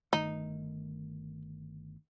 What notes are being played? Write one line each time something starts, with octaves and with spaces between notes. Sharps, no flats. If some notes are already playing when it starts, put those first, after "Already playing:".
G1 D#3 A3 D#4